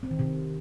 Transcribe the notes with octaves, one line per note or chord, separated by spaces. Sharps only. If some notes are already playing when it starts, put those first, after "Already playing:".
C4
D#3
C3